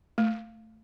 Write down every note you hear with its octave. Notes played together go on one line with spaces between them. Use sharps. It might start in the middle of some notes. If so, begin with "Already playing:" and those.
A3